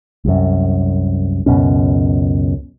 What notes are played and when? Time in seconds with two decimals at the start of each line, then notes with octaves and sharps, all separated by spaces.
0.25 C2 F#2
1.46 C#2 F#2 B2 C#4